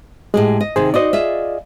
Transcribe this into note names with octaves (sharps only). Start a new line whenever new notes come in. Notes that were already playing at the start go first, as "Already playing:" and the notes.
A2 G#3 G4 G#4
D#5
C3 D#3 G#4 C5
D#4 F#4 C5 D5 D#5
F4 G#4 E5